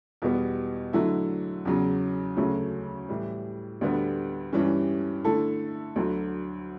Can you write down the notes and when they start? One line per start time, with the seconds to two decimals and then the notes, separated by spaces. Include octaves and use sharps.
0.22 E2 B2 G3 B3
0.93 D3 F#3 A3 E4
1.65 E2 C#3 F#3
2.36 D2 C#3 F#3 A3 C#4
3.09 A2 E3 G3
3.81 D2 D3 G3 B3
4.53 G2 E3 G3 C#4
5.24 D3 A3 E4 A4
5.96 D2 D3 F#3